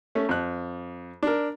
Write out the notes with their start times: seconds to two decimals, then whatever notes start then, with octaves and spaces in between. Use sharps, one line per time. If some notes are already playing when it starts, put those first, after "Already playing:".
0.15 A3 C#4
0.29 F2 F#6
1.23 D4 A#4